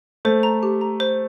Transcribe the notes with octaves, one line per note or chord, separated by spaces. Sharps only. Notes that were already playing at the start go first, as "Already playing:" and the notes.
A3 C5
A#5
G4
A#5
C5